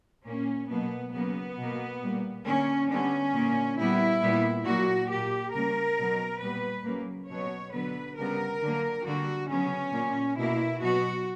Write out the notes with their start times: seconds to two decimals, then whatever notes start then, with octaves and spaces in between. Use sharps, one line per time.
0.25 A#2 A#3 C#4
0.70 B2 F#3 A#3 B3
1.13 C#3 F#3 A#3 B3
1.57 B2 A#3
2.02 A#2 G3 A#3
2.45 D3 A#3 C#4
2.90 D3 G3 B3 C#4
3.34 A#2 A#3
3.78 A#2 G3 B3 E4
4.22 A#2 G3 B3
4.65 A#2 F#3 A#3 F#4
5.09 A#2 A#3 G4
5.53 C#3 G3 A#3 A#4
5.98 B2 F#3 B3
6.42 A#2 G3 B3 B4
6.85 C#3 F#3 A#3
7.30 B2 F#3 B3 C#5
7.73 D3 F#3 B3 B4
8.17 C#3 G3 B3 A#4
8.62 D3 F#3 A#3
9.05 D3 G3 A#3 F#4
9.49 C#3 F#3 B3 C#4
9.93 A#2 A#3
10.38 B2 A#3 E4
10.81 B2 F#3 B3 F#4